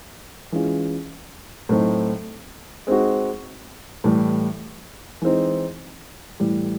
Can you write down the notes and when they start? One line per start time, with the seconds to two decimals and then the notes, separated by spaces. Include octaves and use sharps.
0.52 E3 G#3 C#4 F4
1.69 A2 F#3 A3 C4 D#4
2.87 G#3 C4 D#4 F#4
4.04 A2 E3 G3
5.22 E3 G#3 C4 D#4
6.40 A2 E3 G3